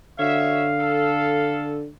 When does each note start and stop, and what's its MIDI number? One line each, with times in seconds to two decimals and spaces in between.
0.19 1.89 50
0.19 0.69 66
0.19 0.69 73
0.19 0.69 76
0.19 1.82 77
0.79 1.80 69